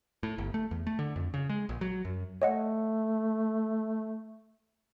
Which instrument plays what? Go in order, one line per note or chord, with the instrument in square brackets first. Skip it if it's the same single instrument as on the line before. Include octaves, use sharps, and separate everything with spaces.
[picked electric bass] A2
G1
A3
E2
A3
D3
F2
C#3
G#3
A#1
F#3
F#2
[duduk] A3 [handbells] C#5 D#5 F#5